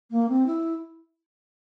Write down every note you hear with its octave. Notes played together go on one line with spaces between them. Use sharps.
A#3
C4
E4